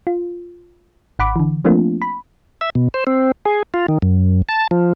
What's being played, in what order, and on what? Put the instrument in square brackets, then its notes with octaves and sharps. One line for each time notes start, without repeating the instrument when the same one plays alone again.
[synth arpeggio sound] F4
G#1 F#5 B5 D6
D3 E3
F3 A3 A#3 C4 D4 F4
B5
[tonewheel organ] E5
B2
C5
C4
G#4
F4
D#3
F#2
A5
F3